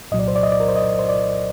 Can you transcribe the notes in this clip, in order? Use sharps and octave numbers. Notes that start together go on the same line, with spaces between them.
C2 A#2 F#3 D#5
D5
C5
D5
D#5
D5
A#4
C5
D#5
C5
D5